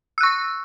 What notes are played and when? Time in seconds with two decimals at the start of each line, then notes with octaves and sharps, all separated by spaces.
0.18 E6
0.21 F#6
0.23 C#6